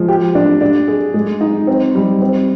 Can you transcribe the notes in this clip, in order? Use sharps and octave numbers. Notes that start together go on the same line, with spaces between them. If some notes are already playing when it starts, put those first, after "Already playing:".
Already playing: F3 G#3
G4
D4
D4
G#4
G#3
D#4
C4
G3
C4